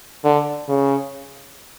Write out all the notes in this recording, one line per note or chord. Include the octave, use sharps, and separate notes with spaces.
D3
C#3